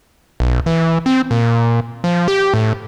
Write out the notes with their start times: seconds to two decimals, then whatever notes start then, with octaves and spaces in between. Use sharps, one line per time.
0.40 B1
0.66 E3
1.06 C4
1.31 A#2
2.04 F3
2.28 G4
2.54 A2